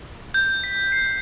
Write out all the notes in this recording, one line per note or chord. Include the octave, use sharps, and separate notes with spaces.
G6
B6
C7